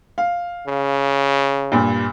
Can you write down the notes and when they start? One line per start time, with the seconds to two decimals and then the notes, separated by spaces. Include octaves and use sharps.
0.18 F5
0.67 C#3
1.72 G2 A#2